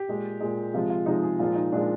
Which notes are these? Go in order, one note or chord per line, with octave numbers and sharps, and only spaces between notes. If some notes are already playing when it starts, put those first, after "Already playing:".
Already playing: G4
A#2 G#3
A#2 G#3
C3 F3 G#3 F4
F4
C3 F3 G#3 D#4
G#4
A#2 F3 G#3 F4
D#4
A#2 F3 G#3 D4